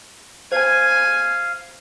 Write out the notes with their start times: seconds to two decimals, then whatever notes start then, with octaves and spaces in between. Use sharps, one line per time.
0.52 C5 F5 G#5